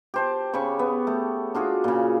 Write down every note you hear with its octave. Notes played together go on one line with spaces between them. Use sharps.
G4 C5 A5
C#3 C#5 B5 C#6
B3
A3
D4 F4 F#4 G#4
A#2 C#3